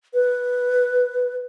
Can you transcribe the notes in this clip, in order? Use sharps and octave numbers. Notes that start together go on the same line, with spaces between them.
B4